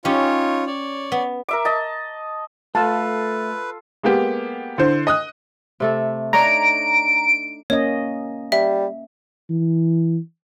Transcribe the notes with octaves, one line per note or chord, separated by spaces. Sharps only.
C#4 D#4 F4 G4 C#5
C#5 D5
B3
A#4 E5 D6
D#5 A5
A3 F4 A4 B4 A5
G#3 A#3 B3 G4
D3 E4 C5
D#5 D#6 F#6
C3 A3 A4
D4 D#4 C#5 A#5 D7
A#3 C#4 C#5 D#5
G3 E5
E3